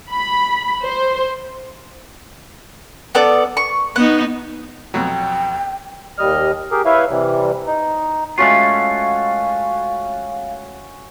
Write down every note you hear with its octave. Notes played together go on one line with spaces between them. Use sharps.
B5
C5
B3 A4 D5
C#6
B3 D#4 F#5
F2 B2 F#3 G5
D#2 G3 D#5 F6
G4 G#4 A#4
E4 B4 C#5 E5 F5
C3 E3 G3
D#4
G#3 A3 C#4 F4 F#4 F5